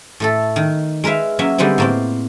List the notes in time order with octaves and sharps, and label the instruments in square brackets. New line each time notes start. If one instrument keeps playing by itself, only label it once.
[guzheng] A2 A3 A4
D#3
G#3 A#4 B4 E5 F5
F#3 A#3 C#4 E5
D3 G3 G#3 B3 C4
A2 A#3 C4